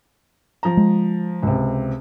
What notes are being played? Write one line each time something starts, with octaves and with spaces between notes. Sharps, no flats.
F3 A#5
G#3
C#2 C3